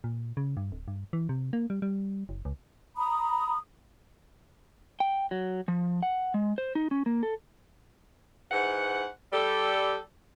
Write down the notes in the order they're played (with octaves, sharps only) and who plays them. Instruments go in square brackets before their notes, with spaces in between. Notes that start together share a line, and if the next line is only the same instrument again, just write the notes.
[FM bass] A#2
C#3
G2
D1
G2
E3
C3
A#3
G3
G3
F#1
C#2
[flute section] A#5 B5 D#6
[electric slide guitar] G5
F#3
F3
F#5
G#3
C5
D#4
C#4
A#3
A4
[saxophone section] G#2 E3 F#5
G3 A4